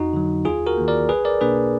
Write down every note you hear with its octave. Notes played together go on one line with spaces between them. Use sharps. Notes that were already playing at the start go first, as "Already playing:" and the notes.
Already playing: F2 D#4 F#4
D3 F#3
D#2 F4 G#4
F#4 A#4
D#3 A#3
A#4 D5
B1 G#4 B4
A#4 D5
B2 A#3 D4 G#4 B4